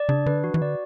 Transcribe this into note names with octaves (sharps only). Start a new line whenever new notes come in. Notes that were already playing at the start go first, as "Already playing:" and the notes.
Already playing: D5
C#3 D4
D3 B4
E3 F#4
E3
D3 D5